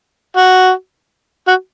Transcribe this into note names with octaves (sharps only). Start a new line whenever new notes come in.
F#4
F#4